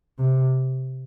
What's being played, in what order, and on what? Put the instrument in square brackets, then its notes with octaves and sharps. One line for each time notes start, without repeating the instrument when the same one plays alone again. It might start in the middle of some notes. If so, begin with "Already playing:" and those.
[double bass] C3